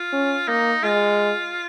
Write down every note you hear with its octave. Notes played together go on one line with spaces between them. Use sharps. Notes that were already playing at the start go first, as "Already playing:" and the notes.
Already playing: F4
C#4
A#3 D#4
G#3 F4